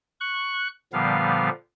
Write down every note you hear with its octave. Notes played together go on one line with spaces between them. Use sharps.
C#6 F#6
A#2 D3 F3 G3 B3 F5